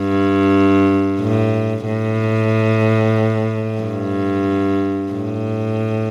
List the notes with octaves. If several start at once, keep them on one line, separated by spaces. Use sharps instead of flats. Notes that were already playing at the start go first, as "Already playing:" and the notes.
Already playing: G2
A2
A2
G2
A2